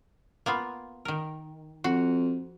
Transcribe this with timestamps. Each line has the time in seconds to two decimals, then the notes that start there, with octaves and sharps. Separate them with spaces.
0.46 A#3 B3 F4
1.05 D#3 A#4
1.84 F2 F#4